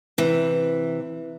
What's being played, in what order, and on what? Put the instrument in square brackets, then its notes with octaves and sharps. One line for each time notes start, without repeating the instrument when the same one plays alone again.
[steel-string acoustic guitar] C3 E3